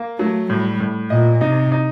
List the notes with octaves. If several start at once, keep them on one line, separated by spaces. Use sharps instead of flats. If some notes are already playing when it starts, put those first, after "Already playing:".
Already playing: A#3
F#3 A3
A2 G3
A2
A#2 D#5
C3 D#4
D#4